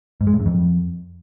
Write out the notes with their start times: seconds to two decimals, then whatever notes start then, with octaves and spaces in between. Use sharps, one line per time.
0.21 G#2
0.27 G#3
0.33 A2
0.40 F#2
0.46 F2